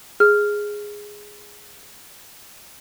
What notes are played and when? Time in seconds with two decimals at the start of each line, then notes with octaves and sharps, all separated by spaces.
0.20 G#4 F6